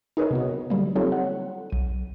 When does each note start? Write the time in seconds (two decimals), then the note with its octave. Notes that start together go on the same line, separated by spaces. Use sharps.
0.17 D#4 G#4 A#4 B4 C#5 D#5
0.31 C3 B3 F#4
0.70 D3 F#3 G3 A#3
0.96 C4 D#4 F4 G4 A4 C#5
1.12 F#5
1.70 B1 D#7